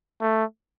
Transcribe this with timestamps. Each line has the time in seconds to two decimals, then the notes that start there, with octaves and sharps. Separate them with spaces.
0.21 A3